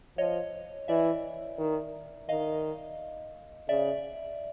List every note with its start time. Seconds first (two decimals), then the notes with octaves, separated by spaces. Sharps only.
0.18 F3 C#5 D#5
0.88 E3 D5 E5
1.58 D#3
2.29 D#3 D#5 F5
3.69 C#3 D5 E5